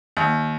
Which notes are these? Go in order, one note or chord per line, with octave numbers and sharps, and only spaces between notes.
D#2